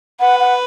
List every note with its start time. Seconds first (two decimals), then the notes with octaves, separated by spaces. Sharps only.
0.20 B4 F#5
0.40 F#5